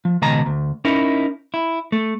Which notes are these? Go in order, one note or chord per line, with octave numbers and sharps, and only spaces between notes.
F3
C#2 B2 D#3 D#5 A5 A#5
D2
C#4 D#4 E4 A#4
E4
A3